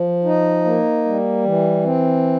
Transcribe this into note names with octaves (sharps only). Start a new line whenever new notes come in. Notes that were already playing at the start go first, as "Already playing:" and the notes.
Already playing: F3
D#4
A#3
G3
E3
C4